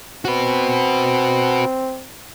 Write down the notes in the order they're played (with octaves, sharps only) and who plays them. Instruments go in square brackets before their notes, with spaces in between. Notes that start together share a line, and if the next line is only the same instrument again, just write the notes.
[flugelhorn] C4 [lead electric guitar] F#4 B4